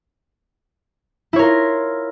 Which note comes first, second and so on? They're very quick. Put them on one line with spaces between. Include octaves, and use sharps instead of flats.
E4 C#5 A#4 F4